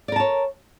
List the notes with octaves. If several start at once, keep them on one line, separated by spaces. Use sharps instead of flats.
A#4 C#5 D5 A5